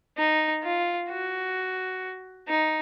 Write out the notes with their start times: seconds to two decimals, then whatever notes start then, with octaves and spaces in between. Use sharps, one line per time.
0.18 D#4
0.63 F4
1.09 F#4
2.49 D#4